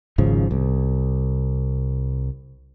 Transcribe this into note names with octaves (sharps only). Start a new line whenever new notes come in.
G#1 G#2 C#3 F3
C2